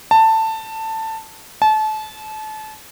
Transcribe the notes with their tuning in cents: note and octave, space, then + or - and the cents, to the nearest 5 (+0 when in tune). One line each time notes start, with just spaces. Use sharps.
A5 +15
A5 -30